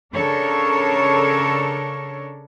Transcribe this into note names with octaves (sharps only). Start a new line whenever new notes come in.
C#3 D4 A4 A#4 C#5